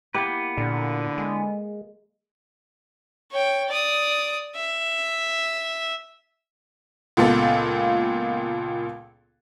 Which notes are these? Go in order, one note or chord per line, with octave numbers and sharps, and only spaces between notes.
A#3 B3 E4 G4 B4
A#2 D3
G#3
C#5 G5
D5 D#6
E5
C#2 A#2 B3 A4